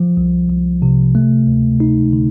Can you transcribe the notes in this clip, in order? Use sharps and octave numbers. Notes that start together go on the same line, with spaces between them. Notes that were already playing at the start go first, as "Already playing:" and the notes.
Already playing: F3
C2
C2
C3
A3
D2
D#4
D3